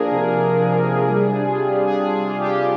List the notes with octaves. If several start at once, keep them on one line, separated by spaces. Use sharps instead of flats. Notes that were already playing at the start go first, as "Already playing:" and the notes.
Already playing: F3 A#3 D4 G#4 A#4
C3
D4
F3
A#3
C3
G3
D4
F4
G3
G3 G#4
D4
G#4
F4
G4
G3